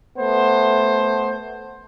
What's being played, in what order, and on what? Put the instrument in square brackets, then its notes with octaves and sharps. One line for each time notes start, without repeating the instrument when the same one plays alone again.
[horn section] A3 B3 C5